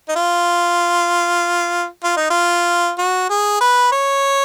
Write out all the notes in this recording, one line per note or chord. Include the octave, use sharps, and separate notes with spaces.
D#4
F4
F4
D#4
F4
F#4
G#4
B4
C#5